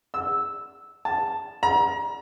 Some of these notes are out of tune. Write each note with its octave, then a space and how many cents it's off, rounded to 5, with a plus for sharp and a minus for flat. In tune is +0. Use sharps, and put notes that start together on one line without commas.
E6 -10
A5 +0
A#5 +30